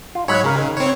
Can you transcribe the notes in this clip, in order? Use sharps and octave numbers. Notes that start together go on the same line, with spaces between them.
F4
G#2 F#3 G#3 C#5 B5
C#3 C#4 A#4
D#3
C4 C#5